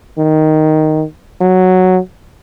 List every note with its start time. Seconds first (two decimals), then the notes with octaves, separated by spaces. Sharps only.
0.18 D#3
1.41 F#3